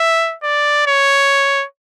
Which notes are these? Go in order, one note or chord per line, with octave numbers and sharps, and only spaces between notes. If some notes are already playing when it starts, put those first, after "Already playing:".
Already playing: E5
D5
C#5